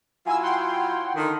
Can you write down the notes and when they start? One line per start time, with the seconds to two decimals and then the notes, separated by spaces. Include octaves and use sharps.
0.26 F#3 E4 F4 G#5 E6
0.42 F#5 G5 C6
1.16 D3 D#3